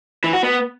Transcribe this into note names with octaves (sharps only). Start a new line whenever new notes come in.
E3
F#4
B3